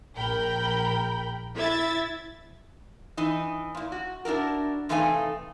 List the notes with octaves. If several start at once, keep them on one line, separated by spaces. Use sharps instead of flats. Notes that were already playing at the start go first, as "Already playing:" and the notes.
A#1 A#4 G5 B5
E4 E5 G#6 A6
E3 D#4
A#2 E4
F#4
D4 E4 F#4 A#4
C3 E3 A3 D#4 F5 G#5